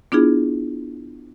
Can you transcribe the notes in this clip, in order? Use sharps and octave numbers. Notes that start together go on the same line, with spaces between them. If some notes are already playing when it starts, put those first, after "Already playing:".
B3 D4 E4 F4 G#4